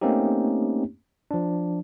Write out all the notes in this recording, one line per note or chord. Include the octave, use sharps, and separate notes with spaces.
A3 A#3 C4 C#4 D#4 G4
F3 D4